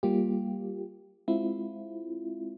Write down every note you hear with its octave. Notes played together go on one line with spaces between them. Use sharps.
G3 A#3 F4 G4
G#3 C4 E4 F4